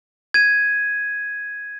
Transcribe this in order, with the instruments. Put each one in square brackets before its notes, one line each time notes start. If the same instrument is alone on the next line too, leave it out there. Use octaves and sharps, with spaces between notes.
[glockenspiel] G#6 D#7